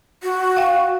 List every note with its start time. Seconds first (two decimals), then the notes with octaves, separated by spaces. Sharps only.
0.23 F#4
0.57 F5 G5